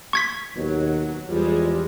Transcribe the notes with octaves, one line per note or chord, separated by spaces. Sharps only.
C#6 G#6 B6
D#2 B2 F#3
E2 F3 G3 G#3